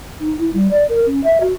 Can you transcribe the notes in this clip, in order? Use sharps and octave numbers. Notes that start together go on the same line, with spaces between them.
D#4
E4
G3
D5
A#4
C#4
E5
F#4